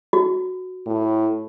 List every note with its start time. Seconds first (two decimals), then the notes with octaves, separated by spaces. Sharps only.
0.13 F#4
0.86 A2